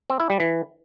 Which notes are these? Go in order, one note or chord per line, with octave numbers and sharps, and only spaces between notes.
C4
E4
G3
E3